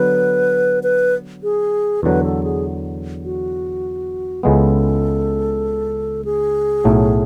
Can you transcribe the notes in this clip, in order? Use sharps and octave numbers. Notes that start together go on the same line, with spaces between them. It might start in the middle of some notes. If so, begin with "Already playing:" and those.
Already playing: D3 F#3 B3 B4
B4
G#4
E2 D3 F#3 B4
A4
G#4
F#4
C#2 C#3 E3 G#3 B3 A4
G#4
B1 A2 F#3 A3